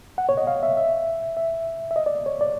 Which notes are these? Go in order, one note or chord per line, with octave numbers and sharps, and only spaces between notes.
F#5
C#5
D#5
F5
E5
E5
E5
E5
D#5
D5
C#5
D5